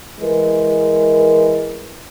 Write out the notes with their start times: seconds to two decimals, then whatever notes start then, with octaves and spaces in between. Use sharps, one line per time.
0.20 E3 G#3 A#4 B4